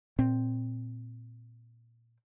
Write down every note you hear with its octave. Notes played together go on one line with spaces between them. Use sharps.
A#2 C4